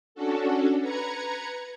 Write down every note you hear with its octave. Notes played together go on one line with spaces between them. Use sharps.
C#4 D4 F#4 A4
B4 A#5 G#6 C#7